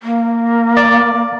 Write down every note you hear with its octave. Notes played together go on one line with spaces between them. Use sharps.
A#3
D5